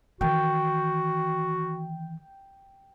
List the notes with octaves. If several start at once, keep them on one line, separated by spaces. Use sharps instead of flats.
D#3 E3 F#4 G5